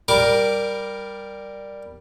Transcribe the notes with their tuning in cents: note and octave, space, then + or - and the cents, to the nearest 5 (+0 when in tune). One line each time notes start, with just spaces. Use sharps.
G3 +0 A#4 +0 D6 +0